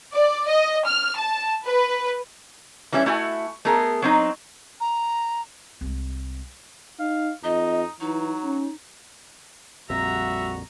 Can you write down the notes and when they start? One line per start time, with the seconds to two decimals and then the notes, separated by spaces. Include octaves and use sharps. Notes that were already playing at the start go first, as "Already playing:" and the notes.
0.13 D5
0.48 D#5
0.86 F6
1.16 A5
1.66 B4
2.92 E3 G3 C#4 D#4 E5
3.06 A3 E4 F#4 G#5
3.65 A3 B3 G#4 A#4
4.02 F#3 C4 D#4
4.80 A#5
5.81 C2 G#3
6.99 D#4 F5
7.44 F2 D#4 D#5
8.01 E3 F#3 D#4
8.44 C#4
9.90 A#1 F2 G3 F#4 E5 A#5